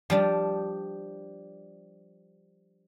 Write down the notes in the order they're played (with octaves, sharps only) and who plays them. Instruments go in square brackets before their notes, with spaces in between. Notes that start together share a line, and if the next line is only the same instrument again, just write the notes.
[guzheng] F3 G3 D4